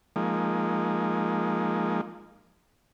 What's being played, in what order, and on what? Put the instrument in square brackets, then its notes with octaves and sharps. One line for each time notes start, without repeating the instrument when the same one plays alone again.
[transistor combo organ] F3 G#3 A#3 D#4